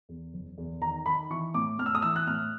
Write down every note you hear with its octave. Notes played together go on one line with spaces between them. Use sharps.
E2
F#1
E2
D#3 A#5
D#3 B5
E3 C#6
A2 D6
A2 F6
E6
D#6
E3 E6
F#6
A2 F6